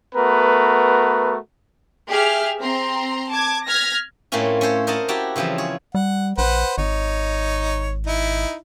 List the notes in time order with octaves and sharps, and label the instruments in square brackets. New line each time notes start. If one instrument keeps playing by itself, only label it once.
[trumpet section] A3 B3 F#4 A#4 B4
[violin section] G4 G#4 E5 F6
C4 A#5 C6
A5 D6 G#6
F6 G#6 A#6 B6
[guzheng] A2 A3 A#3 C4 C#4 F4
C#4 A4 C5 C#5
A#4 C5 D#5 F5 F#5 A5
E4 F#4 G4 G5 A5 A#5
C#3 E3 F3 G3 C4
G#4 C#5
[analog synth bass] G3 [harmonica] F#5
[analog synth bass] A#1 [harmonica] B4 C5 F#5
[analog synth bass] G#1 [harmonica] D#4 C#5
[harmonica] D#4 E4